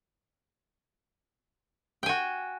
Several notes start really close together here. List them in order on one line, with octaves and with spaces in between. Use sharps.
G5 G#5 F#4